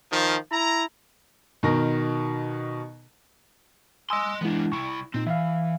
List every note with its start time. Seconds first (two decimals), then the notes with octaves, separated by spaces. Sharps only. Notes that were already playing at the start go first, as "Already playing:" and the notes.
0.11 D#3 F3
0.52 E4 A#5
1.63 B2 D#3 A#4 A#6
4.10 D#5 G#5 C6 D#6 E6
4.41 E3 G#3 B3 D4 E4
4.72 C2 E4 C#6
5.14 A#2 C4 D#4
5.27 E3 E5 F5